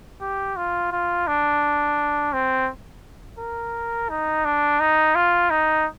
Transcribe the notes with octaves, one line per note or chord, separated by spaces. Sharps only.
G4
F4
F4
D4
C4
A#4
D#4
D4
D#4
F4
D#4